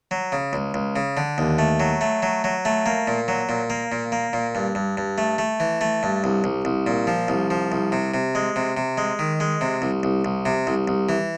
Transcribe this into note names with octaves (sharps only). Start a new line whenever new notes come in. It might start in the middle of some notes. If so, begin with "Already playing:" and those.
F#3
C#3
C#2
C#2
C#3
D3
D#2
A3
F#3
A3
F#3
F#3
A3
A#3
A#2
F#3
A#2
A#3
A#2
A#3
A#2
G2
G2
G2
A3
A3
E3
A3
G2
C2
C2
C2
A#2
F3
C2
F3
C2
C3
C3
G#3
C3
C3
G#3
D#3
G#3
C3
C2
C2
C2
C3
C2
C2
E3